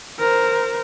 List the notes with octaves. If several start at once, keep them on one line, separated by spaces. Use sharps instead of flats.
A#4 C5